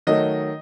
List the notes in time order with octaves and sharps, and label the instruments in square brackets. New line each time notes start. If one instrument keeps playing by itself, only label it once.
[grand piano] D#3 F#3 A3 D#5